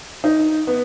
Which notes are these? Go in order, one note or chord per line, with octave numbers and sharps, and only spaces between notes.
D#4
B3